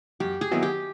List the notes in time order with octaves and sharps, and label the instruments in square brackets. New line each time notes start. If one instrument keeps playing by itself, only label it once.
[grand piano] F#2 [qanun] G4
[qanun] G#4
[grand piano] D#3 F#3 B3 E4
[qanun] G4